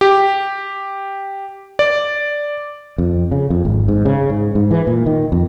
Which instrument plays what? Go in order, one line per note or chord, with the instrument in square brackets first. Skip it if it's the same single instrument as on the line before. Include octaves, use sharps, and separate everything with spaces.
[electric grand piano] G4
D5
[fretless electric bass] F2
C#3
F2
G#1
G#2
C#3
G#2
G#2
E3
A#2
D#3
F2